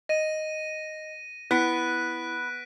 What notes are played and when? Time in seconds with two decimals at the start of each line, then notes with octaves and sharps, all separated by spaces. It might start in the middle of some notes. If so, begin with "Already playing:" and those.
0.09 D#5 A#6 D#7
1.51 B3 E4 F#6 B6 D7